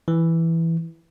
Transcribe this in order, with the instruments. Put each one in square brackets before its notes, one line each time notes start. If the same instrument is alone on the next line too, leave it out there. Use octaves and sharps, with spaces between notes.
[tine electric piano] E3